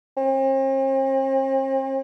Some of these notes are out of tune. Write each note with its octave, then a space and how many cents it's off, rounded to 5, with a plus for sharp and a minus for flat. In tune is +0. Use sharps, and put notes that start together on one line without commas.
C4 +45